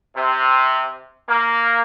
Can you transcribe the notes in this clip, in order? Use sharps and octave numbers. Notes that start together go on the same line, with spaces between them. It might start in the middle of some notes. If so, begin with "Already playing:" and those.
C3
A#3